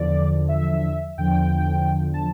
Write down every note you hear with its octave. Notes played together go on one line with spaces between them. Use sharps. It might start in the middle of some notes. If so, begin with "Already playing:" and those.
Already playing: E2 D3 F3 D5
E5
E2 D3 F3 G5
A5